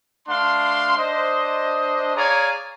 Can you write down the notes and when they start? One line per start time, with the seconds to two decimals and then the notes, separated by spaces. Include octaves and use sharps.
0.28 A3 D4 F5 C6
0.97 D4 C5 D#5
2.16 G#4 C#5 D5 F5 G#5 A#5